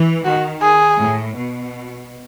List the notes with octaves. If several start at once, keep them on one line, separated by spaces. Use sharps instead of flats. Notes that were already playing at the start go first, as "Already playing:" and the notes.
Already playing: E3
D#3 F#4
G#4
A2
B2